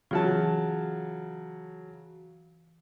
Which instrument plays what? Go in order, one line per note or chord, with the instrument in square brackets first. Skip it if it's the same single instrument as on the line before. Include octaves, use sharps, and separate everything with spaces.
[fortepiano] C#3 F#3 A5 [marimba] E3 F4